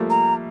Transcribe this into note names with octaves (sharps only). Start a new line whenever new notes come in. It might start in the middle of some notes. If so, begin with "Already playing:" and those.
Already playing: F3 G3 A3 A#3
A#5